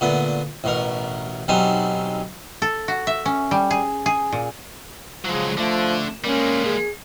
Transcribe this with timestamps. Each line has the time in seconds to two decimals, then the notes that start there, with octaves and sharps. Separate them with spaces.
0.01 A#2 D3 A3 B3
0.64 A1 B2 A#4
1.48 B1 F#3 G3 C4 D#4 G#5
2.62 A4
2.88 F#4
3.07 E5
3.26 C#4
3.51 G3
3.71 G#4
4.06 G#4
4.32 A#2
5.25 C#3 F3 F#3 G#3
5.58 D3 F3 A3
6.24 G3 G#3 A#3 C#4
6.65 G#4